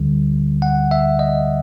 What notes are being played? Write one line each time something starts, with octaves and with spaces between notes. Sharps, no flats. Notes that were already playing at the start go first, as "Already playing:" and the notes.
Already playing: D2 D3 G3
F#5
E5
D#5